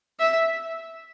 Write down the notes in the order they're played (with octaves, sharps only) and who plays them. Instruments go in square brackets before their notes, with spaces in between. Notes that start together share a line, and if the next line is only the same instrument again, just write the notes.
[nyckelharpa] E5